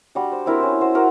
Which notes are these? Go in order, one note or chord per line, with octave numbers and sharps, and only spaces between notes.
G3 D4 F#4
C5
C4 D4 E4 A#4
C#4 C5
F#4 C5
F#4 A#4 B4 F#5